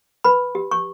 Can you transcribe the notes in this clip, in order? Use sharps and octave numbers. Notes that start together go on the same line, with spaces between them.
B4 B5
G4
C#6